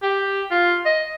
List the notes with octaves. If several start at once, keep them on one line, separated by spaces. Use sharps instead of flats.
G4
F4
D#5